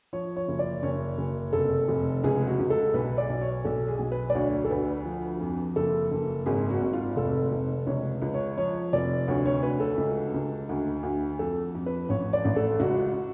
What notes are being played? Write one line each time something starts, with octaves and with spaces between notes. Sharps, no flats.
F3 C#5
C#5
F#1
D5
F#1 C#5
F#1
F1 A4
F1
C#2 G#4
F#4
C#2
A4
B1 B4
D5
B1
C#5
B1 A4
G#4
B1
B4
D5
D2 C#5
A4
D2 B4
F3
F2
F#1 A4
F#1
G#1 G#4
F#4
G#1
F4
F1 A4
F1
C#2 C#5
C#2
C#5
F3 C#5
F1 D5
D2 C#5
C#5
D2 B4
A4
C#2
C#2
D2
D2
F2 A4
F2
B4
A1 C#5
D5
A1
A4
C#2 F#4